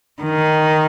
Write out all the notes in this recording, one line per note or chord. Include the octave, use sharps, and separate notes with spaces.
D#3